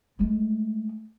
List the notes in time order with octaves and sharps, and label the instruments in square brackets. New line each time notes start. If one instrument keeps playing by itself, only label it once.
[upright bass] G#3 A3